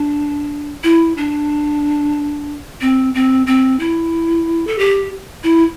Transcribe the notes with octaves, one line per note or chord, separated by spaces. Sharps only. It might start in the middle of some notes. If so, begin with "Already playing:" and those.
Already playing: D4
E4
D4
C4
C4
C4
E4
A4
G4
E4